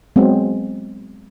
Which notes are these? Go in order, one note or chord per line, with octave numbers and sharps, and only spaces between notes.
F#3 G#3 B3 C4